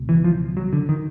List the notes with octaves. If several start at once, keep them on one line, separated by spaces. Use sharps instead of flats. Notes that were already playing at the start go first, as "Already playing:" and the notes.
Already playing: C#2 B2
E3
F3
F#3
D3
D#3